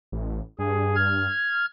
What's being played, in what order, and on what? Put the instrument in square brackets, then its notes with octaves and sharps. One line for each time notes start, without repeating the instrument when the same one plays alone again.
[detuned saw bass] A1
[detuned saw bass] G2 [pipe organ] G#4
[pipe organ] F6 G#6